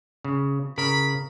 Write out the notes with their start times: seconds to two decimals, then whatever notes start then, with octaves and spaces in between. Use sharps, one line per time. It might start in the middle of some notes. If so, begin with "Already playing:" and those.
0.25 C#3
0.78 C#3 A#4 B5